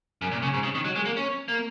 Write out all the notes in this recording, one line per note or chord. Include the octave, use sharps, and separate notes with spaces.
F#2
A#2
C#3
G#2
C#3
D#3
F#3
G#3
A#3
C#4
A#3